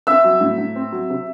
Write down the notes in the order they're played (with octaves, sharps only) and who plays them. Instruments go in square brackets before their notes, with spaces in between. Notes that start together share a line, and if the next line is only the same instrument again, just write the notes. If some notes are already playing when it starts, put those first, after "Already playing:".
[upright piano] C4 E5 E6
F#3
A2
A2
C4
F#3
C3